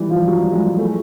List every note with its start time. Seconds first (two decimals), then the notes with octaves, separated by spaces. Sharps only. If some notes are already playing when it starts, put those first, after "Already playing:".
Already playing: E3 G3
0.10 F3
0.27 F#3
0.39 G3
0.52 G#3
0.66 G#3
0.78 A3